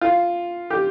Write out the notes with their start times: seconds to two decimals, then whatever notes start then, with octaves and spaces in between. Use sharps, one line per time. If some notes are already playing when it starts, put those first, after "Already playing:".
0.01 F4
0.70 G4